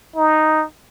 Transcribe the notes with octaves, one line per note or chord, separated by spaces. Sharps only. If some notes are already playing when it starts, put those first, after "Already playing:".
D#4